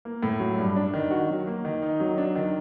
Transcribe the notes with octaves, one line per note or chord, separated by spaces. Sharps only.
A#3
A2
F#3
G2
D4
D#3
F#4
F#3
A#3
D#3
D#4
F#3
D4
D#3